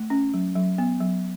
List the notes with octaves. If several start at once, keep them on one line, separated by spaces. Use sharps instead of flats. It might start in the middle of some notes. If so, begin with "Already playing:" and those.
Already playing: A3
C#4
F#3
F#3
B3
F#3